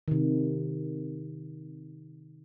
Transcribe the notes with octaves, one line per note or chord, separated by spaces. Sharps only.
C3 D#3